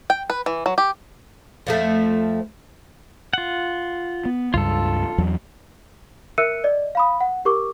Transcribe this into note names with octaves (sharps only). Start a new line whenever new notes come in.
G5
B4
E3
F#3
G4
F2 F3 A3
F4 F#5
B3
C#2 G2 F4 A4
E2 F#3
A#4 E5 E6 F#6 C#7 D#7
D5 D#5
F5 B5 D#6
F#5
G4 A#4 C#6 D6